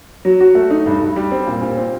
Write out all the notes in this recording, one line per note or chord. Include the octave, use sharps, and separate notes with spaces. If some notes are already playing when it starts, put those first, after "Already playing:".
F#3
F#4
A3
D#4
G2
G2
G3
C4
A#2
A#2
C4